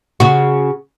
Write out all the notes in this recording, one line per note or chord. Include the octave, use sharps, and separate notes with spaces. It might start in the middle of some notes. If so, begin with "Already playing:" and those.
C#3 F#4